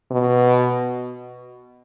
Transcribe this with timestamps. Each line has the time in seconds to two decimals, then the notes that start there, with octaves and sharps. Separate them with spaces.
0.11 B2